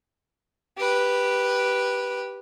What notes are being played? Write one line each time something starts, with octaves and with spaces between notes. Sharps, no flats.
G4 B4